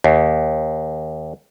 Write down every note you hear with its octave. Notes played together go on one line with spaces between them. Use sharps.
D#2